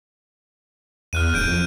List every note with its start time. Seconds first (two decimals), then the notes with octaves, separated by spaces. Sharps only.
1.13 E2 F6 F#6 D#7
1.34 D1 G6 D7 D#7
1.47 F2